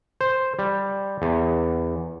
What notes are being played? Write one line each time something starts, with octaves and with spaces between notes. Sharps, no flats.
C5
G3
E2